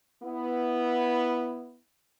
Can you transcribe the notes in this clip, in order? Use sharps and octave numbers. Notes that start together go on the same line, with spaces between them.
B3 E4